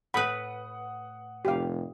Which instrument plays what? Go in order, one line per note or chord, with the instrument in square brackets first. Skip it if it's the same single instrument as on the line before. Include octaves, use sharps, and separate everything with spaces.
[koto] A2 B4 [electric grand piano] F#5 D#6 [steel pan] B5
[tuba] F1 [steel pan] G4 F5